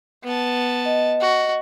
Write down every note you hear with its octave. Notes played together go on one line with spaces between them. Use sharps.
B3 A5
D#5
F#4